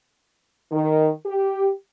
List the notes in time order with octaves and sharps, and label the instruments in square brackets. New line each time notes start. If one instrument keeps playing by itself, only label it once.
[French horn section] D#3
G4